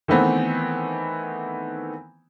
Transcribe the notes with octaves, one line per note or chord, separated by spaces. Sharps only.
D#3 E3 A3 B3 C4